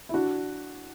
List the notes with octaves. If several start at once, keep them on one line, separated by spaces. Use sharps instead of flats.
E4
D4 F#4